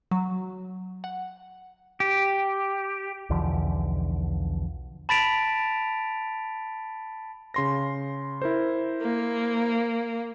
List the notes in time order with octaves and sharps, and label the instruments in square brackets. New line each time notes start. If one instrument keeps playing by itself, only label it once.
[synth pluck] F#3
F#5
[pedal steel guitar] G4
[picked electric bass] B1 E2 D3 F3
[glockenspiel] A5 B5 A6 B6 D7 F7
[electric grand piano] C#3 C6 A#6
E4 A#4 C5
[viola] A#3